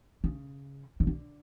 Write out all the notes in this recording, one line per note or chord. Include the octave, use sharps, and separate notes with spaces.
C#3
C#3
D3